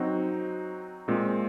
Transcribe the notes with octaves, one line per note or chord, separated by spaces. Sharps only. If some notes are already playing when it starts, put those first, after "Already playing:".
Already playing: F#3 C4 D#4 F#4
A#2 G#3 C4